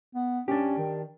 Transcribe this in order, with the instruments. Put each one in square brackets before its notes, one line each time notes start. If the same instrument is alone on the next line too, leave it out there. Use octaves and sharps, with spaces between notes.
[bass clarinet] B3
[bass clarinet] C#4 [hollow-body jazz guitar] D4 G4
[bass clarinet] D#3